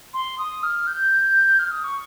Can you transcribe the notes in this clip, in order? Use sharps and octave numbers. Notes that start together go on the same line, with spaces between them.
C6
D#6
F6
G6
F6
D#6
C#6